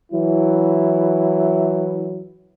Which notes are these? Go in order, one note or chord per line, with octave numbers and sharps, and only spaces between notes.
E3 F#3 E4